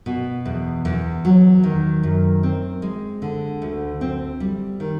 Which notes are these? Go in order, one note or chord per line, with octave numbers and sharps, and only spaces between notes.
B2
E2
E2
F#3
D#3
F#2
C4
G#3
D3
D2
C4
G3
D#3